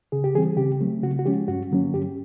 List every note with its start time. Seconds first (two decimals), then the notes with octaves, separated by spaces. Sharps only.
0.12 C#3 G#4
0.24 G4
0.35 E3 G3 C4 G#4
0.57 C#3 G4
0.81 F#3 A3 C4
1.03 C#3 F#4
1.19 F#4
1.26 F3 G#3 C#4 G4
1.48 G2 F#4
1.71 D3 F#3 A#3 C#4
1.94 G2 G4